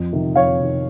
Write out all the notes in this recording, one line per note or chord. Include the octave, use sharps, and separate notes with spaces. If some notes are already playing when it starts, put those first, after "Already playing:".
Already playing: F2
C3 D#3
F2 C#5 F5
C3 D#3